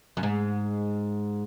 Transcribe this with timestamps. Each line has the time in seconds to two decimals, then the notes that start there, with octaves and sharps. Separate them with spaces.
0.17 F#2
0.23 G#2